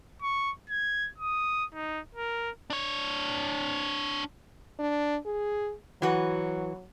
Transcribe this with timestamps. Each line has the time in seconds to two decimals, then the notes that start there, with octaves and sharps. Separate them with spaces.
0.22 C#6
0.70 G#6
1.18 D#6
1.74 D#4
2.15 A#4
2.70 D4 C#5
4.79 D4
5.26 G#4
6.02 E3 F#3 F#4 B4